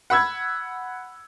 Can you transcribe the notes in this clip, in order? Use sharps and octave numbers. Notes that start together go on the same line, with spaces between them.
F#5 B5 E6 G#6